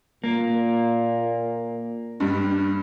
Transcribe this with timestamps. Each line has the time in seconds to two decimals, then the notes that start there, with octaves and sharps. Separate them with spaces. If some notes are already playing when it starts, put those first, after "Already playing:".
0.24 A#2 A#3
2.20 G2 G3